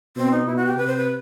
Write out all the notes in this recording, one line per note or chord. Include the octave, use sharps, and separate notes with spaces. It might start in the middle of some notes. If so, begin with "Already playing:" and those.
B2 C4
D#4
B2 E4
F#4
G4
C3 B4
C5
B4